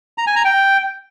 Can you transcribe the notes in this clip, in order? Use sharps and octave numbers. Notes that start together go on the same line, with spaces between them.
A#5
G#5
A#5
G5